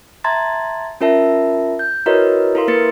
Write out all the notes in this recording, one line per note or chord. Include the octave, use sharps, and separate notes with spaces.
E5 A5 A#5 C6 G#6 A6
C#4 F4 A#4 E5 A5
G6
E4 F#4 A#4 B4 C#5 D#5
E4 A4 A#4 F5 C6
A#3 A#4 B4 A6 C#7